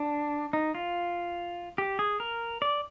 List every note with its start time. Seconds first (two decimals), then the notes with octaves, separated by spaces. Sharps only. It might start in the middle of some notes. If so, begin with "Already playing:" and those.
Already playing: D4
0.53 D#4
0.75 F4
1.78 G4
1.99 G#4
2.20 A#4
2.62 D5